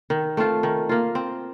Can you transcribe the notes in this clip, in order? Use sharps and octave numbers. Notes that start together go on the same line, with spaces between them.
D#3
A3 C4 F4
D#3
A#3 F4
C4